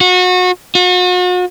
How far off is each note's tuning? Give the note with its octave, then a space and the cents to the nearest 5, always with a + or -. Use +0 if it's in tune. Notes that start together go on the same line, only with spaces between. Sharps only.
F#4 -30
F#4 -40